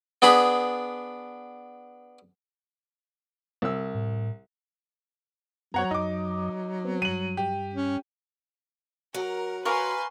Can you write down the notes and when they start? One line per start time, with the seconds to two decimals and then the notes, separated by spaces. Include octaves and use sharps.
0.22 B3 D4 G#4 B5
3.62 C2 E6
3.95 A2
5.74 F#2 F#3 B3 C#5 F#5 A#5 G#6
5.91 F#2 D#4 D#5 D6
6.85 B3 C4
7.02 G2 D#7 F#7
7.37 G4
7.73 C#4
9.14 F#3 A#4
9.65 A#4 B4 F5 G#5 C6 C#6